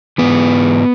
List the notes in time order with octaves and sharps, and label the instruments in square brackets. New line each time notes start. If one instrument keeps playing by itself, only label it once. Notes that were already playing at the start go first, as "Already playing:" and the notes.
[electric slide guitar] G#2 E3 B3